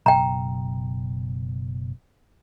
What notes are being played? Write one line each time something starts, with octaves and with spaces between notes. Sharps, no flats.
F#1 B2 F#3 G5 A#5